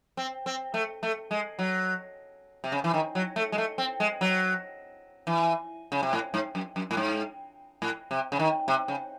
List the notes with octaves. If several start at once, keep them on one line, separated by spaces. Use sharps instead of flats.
C4
C4
A3
A3
G#3
F#3
C3
C#3
E3
D#3
F#3
A3
G#3
A3
C4
G#3
F#3
E3
C#3
C3
A2
G#2
F#2
F#2
A2
G#2
A2
C3
C#3
D#3
C3
C#3